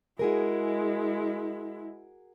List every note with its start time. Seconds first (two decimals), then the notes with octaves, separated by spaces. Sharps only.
0.19 G#3 E4 F#4 G#4 A#4